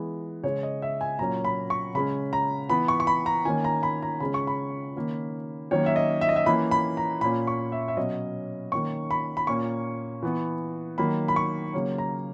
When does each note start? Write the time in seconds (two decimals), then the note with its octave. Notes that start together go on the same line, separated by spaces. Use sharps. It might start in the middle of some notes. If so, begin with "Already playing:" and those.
Already playing: E3 G#3 B3
0.44 C#3 G#3 C#4 C#5
0.63 D#5
0.82 E5
1.01 G#5
1.19 A#2 F#3 A#3 C#4 A#5
1.45 B5
1.70 C#6
1.95 C#3 G#3 C#4 B5
2.33 A#5
2.70 E3 B3 B5
2.88 C#6
3.00 C#6
3.07 B5
3.26 A#5
3.45 D#3 A#3 C#4 G#5
3.64 A#5
3.83 B5
4.02 A#5
4.20 C#3 G#3 C#4 B5
4.34 C#6
4.47 B5
4.96 D#3 A#3 C#4
5.71 D#3 F#3 A#3 C#4 C#5
5.86 E5
5.96 D#5
6.21 E5
6.29 D#5
6.36 E5
6.46 E3 A#3 C#4 B5
6.71 B5
6.97 A#5
7.21 A#2 A#3 C#4 B5
7.47 C#6
7.72 E5
7.88 E5
7.97 B2 F#3 C#4 D#5
8.72 D#3 A#3 C#4 C#6
9.11 B5
9.37 B5
9.47 A#2 A#3 C#4 C#6
10.23 E3 B3
10.98 D#3 F#3 A#3 B5
11.28 B5
11.36 C#6
11.74 C#3 F#3 A#3 C#4
11.98 A#5